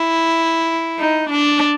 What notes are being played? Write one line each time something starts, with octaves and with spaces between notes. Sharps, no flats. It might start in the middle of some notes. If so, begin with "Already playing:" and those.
Already playing: E4
D#4
D4